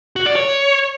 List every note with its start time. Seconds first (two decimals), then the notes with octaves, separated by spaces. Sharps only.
0.16 F#4
0.26 D5
0.36 C#5